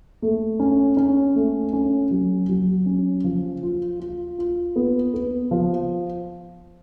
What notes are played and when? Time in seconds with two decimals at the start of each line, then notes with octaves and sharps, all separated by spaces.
0.22 A3
0.60 C#4
0.97 C#4
1.35 A3
1.73 C#4
2.11 F#3
2.49 F#3
2.86 C#4
3.24 F3
3.63 F4
4.00 F4
4.38 F4
4.76 B3
5.14 B3
5.51 F3